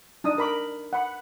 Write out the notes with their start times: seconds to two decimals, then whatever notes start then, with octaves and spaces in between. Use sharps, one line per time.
0.24 D4 D#4 D#6
0.38 A#4 B5 D6
0.93 F#5 B5